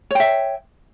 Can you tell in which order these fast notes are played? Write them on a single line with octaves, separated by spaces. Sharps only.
C#5 G5 E5